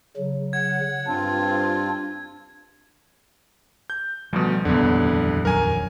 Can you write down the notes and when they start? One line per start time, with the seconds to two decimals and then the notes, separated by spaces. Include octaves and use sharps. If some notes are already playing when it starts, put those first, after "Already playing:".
0.17 C#3 F#3
0.53 F#5 G#6
1.07 G2 C4 D4 F4
3.90 G6
4.33 D2 B2 F3 G3
4.65 D#1 C2 F2 D3 F#3 B3
5.45 A#1 F#2 F#3 A#4 G#5